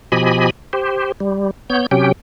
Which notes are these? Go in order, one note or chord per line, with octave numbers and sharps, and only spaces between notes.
B2 F3 G4 D#5 G#5 B5
G4 C5
G3
B3 C#5 G6
C3 F#3 C#4 G4 G5